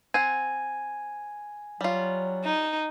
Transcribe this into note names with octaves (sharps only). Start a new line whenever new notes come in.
C4 C5 F#5 G#5
F#3 G3 F4
D#4